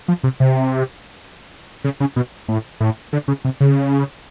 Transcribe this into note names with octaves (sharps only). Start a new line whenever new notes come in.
F3
C3
C3
C#3
C#3
B2
A2
A2
D3
C#3
C3
C#3